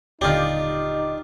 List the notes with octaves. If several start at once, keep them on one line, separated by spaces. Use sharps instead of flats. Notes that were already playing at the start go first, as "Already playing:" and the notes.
D#1 D3 D4 D#4 F4 G4 D#5 F5